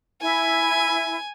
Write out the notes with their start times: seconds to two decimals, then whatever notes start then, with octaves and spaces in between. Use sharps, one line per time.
0.22 E4 G#5